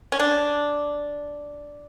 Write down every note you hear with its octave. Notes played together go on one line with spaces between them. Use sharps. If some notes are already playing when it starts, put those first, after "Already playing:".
C#4
D4